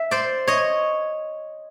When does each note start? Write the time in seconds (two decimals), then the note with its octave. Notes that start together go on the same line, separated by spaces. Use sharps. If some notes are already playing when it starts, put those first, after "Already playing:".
Already playing: E5
0.11 C5 D5
0.48 C#5 D#5